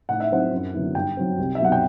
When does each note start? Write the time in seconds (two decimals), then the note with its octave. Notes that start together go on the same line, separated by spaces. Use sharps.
0.09 A2 F#5
0.20 E5
0.31 F#3 C4 E4 F#5
0.52 F#2
0.74 D3 F#3 B3 E4
0.95 G2 G5
1.17 F#3 C4
1.38 C2
1.55 E5
1.60 B2 F#3 F#5
1.72 G5